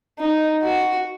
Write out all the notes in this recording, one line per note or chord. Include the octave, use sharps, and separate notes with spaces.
D#4
F#4